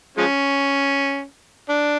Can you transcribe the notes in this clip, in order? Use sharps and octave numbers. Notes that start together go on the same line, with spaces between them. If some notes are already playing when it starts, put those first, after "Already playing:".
F3 G#3 C#4
D4